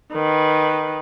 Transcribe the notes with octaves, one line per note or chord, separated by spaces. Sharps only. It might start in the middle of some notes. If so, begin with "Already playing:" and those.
D#3 B4